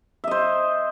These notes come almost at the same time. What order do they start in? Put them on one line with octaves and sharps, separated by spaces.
E5 D#5 C5